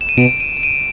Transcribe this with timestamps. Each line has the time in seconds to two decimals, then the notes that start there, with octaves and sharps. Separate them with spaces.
0.01 E7
0.09 D#7
0.17 B2 D7
0.40 D#7
0.63 D#7